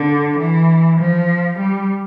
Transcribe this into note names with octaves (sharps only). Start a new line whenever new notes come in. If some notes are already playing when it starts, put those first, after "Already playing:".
Already playing: D3
E3
F3
G3